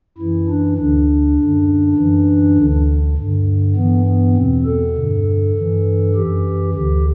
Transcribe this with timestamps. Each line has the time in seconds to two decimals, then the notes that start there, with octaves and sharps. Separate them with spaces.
0.18 F#2 E3 E4
0.48 D4
0.77 D2 D3 D4
1.37 F#2 D3
1.97 F#2 E3
2.57 D2 D3
3.17 G2 D3
3.76 G2 E3 B3
4.06 B3
4.36 E2 B2 C4
4.65 A4
4.96 G2 D3
5.55 G2 E3
6.14 F#2 E3 G4
6.74 D2 D3 G4